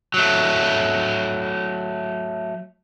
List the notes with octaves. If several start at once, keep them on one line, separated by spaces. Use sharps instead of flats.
F#3 A3